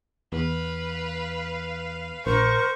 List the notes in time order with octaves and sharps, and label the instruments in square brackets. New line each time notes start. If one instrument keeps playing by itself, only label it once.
[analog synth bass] E2 [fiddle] B4 F5
[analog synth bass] A#1 [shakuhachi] A#4 [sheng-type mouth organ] C5 [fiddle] C#6